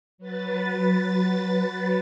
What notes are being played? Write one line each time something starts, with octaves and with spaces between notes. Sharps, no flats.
F#3 B4 A6